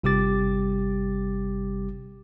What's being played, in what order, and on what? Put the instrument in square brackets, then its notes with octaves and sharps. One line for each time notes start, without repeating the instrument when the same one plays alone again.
[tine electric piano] G1 C3 G3 G4 D6 A6